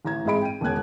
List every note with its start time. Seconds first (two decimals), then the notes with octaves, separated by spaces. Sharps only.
0.05 A1 A#5 G#6
0.25 G#2 C4 G#4 D#5 B5 D7
0.42 G5 D#7
0.61 E1 C#3 B3 F#6 G#6